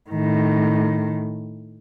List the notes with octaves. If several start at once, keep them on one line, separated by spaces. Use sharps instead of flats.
A2 D#3